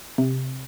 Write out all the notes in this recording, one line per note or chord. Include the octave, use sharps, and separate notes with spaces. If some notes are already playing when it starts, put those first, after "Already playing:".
C3